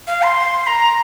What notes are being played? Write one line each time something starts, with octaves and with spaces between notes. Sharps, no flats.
F5
C6
A#5